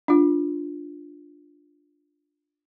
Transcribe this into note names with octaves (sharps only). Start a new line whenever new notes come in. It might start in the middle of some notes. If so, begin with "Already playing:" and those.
D4 F4